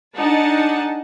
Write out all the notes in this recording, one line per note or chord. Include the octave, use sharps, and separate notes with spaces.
D4 D#4 G#4 F#5 A5